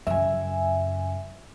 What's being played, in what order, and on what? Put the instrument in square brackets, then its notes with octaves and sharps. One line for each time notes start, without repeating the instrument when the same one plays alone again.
[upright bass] F#2 C#3 [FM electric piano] E5 G#5